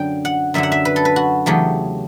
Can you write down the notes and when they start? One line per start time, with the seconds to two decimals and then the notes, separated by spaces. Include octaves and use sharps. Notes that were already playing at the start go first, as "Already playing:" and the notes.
Already playing: F#2 D3 F#3 G5
0.25 F#5
0.54 F#2 D3 F#3 E5
0.63 F#5
0.72 E5
0.85 B4
0.96 A4
1.05 B4
1.16 F#4
1.46 E2 C#3 F#3 A3 G4